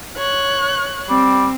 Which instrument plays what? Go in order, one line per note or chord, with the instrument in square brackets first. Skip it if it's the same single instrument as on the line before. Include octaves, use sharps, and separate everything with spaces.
[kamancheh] C#5 F#6
[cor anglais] G3 [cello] C4